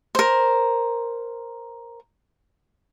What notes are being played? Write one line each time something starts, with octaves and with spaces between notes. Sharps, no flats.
A#4 C5